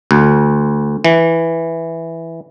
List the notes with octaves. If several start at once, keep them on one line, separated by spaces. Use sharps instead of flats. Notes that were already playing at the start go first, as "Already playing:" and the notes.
D2
E3